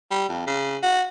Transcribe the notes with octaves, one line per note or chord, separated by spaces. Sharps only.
G3
F2
C#3
F#4